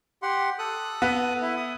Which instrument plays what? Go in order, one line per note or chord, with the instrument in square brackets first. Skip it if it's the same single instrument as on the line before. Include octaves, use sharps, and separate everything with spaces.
[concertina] G4 F#5 C6
A4 D#6 F#6
[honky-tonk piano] B3
[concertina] E4 E5
D#6